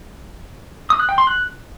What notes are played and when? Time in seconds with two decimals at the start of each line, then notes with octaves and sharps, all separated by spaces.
0.90 D#6
1.00 F#6
1.09 G5
1.18 C6
1.27 F#6